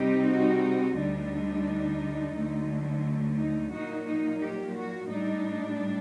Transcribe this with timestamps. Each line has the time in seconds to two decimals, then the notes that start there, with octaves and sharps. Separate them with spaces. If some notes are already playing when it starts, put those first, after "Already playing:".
Already playing: C3 G3 C4 D#4 G4
0.27 F#4
0.95 D2 D3 G3 D4 D#4
2.33 D2 D3 F#3 A3
3.37 D#4
3.71 A#2 F#3 A#3 D#4 F#4
4.07 D#4
4.41 G4
4.74 F#4
5.09 A2 G3 D4 D#4